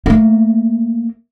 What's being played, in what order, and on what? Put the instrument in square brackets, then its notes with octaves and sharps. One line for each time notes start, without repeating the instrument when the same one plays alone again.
[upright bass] A3 A#3